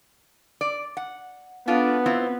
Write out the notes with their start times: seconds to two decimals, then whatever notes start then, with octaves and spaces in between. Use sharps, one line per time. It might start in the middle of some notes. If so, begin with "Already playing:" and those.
0.61 D5
0.97 F#5
1.68 B3 D4 F4 A4
2.06 C4 E4 F4